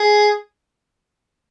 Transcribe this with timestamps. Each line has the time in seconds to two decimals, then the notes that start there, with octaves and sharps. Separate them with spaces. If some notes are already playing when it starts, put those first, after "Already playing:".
Already playing: G#4